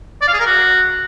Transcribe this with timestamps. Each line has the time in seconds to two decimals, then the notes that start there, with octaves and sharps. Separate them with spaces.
0.21 D5
0.27 F5
0.33 G#4
0.40 A#4
0.46 F#4